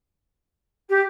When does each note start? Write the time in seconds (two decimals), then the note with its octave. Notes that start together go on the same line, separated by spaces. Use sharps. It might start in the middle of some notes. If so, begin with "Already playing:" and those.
0.89 G4